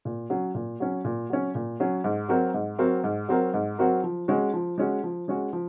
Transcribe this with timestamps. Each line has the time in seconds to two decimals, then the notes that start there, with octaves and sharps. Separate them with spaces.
0.05 A#2
0.30 F#3 C#4
0.55 A#2
0.80 F#3 C#4
1.05 A#2
1.30 F#3 C#4
1.55 A#2
1.80 F#3 C#4
2.04 G#2
2.29 F#3 C4 F#4 A#4
2.54 G#2
2.79 F#3 C4 F#4 A#4
3.04 G#2
3.29 F#3 C4 F#4 A#4
3.54 G#2
3.79 F#3 C4 F#4 A#4
4.03 F3
4.28 G#3 C#4 F#4
4.54 F3
4.78 G#3 C#4 F#4
5.04 F3
5.28 G#3 C#4 F#4
5.53 F3